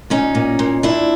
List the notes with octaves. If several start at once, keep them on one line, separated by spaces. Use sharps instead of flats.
A#2 C#4 D#4
A#2
A#2
A#2 D4 E4